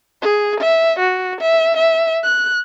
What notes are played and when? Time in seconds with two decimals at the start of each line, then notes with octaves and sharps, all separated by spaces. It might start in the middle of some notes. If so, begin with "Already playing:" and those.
0.22 G#4
0.60 E5
0.99 F#4
1.41 E5
1.77 E5
2.24 F#6